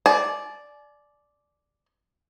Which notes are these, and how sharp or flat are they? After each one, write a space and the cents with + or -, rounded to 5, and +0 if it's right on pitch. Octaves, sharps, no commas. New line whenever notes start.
D5 +0 G#5 +45